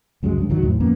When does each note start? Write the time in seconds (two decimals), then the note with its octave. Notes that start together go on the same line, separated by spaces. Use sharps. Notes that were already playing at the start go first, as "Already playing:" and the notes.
0.23 C#2 F#2 F#3 G#3
0.38 G2 D3
0.50 C#2 D#3 F#3
0.63 E2 A2
0.80 F2 A#3 B3 C#4